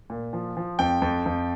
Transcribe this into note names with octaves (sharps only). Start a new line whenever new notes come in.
A#2
F3
F3
F2 G5
F2
F2